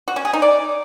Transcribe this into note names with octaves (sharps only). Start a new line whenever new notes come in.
F#4
C#4
G#4
D#4
D5